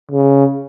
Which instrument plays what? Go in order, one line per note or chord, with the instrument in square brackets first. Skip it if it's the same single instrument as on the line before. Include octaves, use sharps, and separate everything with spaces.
[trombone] C#3